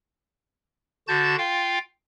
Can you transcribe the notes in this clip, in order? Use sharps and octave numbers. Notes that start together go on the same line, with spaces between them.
D3 F#4 A5 G6 A6
F4 F5 G5